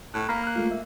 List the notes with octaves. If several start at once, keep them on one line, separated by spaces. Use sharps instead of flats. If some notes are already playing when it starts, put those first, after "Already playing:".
A2 F#6
A#3 A#5 B5 F6
F6 F#6
G#3 A3 F4
E5